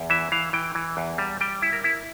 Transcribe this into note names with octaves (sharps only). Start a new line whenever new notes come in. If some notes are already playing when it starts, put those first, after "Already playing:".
Already playing: E2
E3 E5
E3 F5
E3 G5
E3
E2
G3
G3 G5
E4
A#4
E4